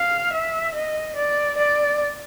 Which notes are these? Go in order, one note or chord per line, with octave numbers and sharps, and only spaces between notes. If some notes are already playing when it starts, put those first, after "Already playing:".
Already playing: F5
E5
D#5
D5
D5